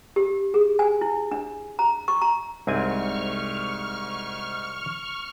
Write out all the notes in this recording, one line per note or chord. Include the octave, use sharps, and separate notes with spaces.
G4
G#4
G#5
E4
D4
A#5
C#6
A#5
C2 G#2 C4 G#5 C#6 F6